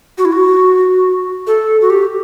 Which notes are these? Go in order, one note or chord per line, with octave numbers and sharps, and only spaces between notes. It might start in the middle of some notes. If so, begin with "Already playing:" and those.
F#4
E4
F#4
A4
F#4
G4